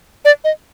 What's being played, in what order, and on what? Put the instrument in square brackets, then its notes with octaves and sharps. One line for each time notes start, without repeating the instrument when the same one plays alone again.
[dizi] D5
D#5